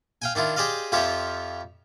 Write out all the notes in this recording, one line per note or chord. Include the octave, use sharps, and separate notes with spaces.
F5 G5 G#5
D#3 D4 E4 F4
G4 G#4 C5 D5 D#5 F5
F2 F3 F4 G4 C#5 E5